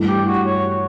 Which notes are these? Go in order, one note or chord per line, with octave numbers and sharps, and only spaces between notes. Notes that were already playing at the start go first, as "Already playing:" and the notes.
Already playing: G2 E3 A3 E4
G4
F#4
C#5